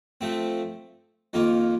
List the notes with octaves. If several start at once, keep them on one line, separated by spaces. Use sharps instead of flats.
F3 A3 C4
F2 D#3 A#3 F4